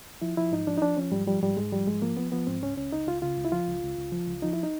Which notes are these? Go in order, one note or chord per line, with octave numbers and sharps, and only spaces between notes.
F3 E4
F3 E4
G#2 D#4
F3 D4
D#4
F3 D4
F3 C#4
G#2 G3
F3 G3
G#2 G3
G#2 G#3
F3 G3
G#2 G#3
F3 A#3
F3 B3
F3 B3
G#2 C4
C#2 C#4
C#2 C#4
C#2 D#4
C#2 F4
C#3 F4
C#2
E4
F3 F4
C#2
C#2
C#2
F3
C#2
F3 D#4
E4
D#4